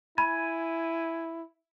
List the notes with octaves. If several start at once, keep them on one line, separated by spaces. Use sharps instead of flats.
E4 G#5 B5